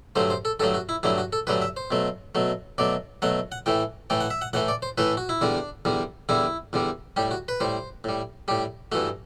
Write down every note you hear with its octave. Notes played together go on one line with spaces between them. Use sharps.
G2 D3 F#3 A3 C5
C5
A4
G2 D3 F#3 A3 A4
F#4
E4
G2 D3 F#3 A3 E4
F#4
A4
G2 D3 F#3 A3 B4
E5
C5
B2 F#3 A3
B2 F#3 A3
B2 F#3 A3 D5
B2 F#3 A3 F#5
F#5
A2 E3 A3 G5
A2 E3 A3 G5
F#5
E5
F#5
A2 E3 A3 F#5
D5
C5
A2 E3 A3 B4
F#4
E4
E2 D3 G3 D4
E2 D3 G3
E2 D3 G3 E4
E2 D3 G3
A2 G3 G4
F#4
B4
A2 G3 C5
A2 G3
A2 G3 G4
G2 E3 A3 F#4